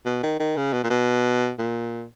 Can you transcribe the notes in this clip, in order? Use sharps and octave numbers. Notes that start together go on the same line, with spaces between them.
B2
D#3
D#3
C#3
B2
A#2
B2
A#2